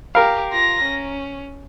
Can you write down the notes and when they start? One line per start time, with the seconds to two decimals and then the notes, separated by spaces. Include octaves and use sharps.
0.15 G4 A#4 F5
0.52 F4 A#6
0.84 C#4